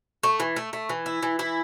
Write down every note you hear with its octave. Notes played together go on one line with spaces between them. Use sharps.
A3
E3
A3
A3
E3
E4
E3
E4